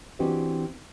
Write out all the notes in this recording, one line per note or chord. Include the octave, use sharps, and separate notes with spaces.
E3 C4 D4 F#4 G4 D#5